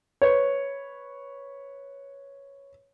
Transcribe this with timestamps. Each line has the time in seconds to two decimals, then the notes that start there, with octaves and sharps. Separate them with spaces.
0.22 B4 C#5